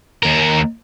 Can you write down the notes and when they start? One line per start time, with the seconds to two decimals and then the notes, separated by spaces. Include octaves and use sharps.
0.23 D#2 A#4